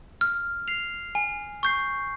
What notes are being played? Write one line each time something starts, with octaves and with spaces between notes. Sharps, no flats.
F6
C7 F7
G#5
C#6 G6 C7